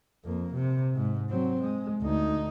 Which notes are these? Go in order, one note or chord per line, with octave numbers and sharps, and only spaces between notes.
F2 A#3
C3
G#2
F#3 C4
G#3
D2 D#4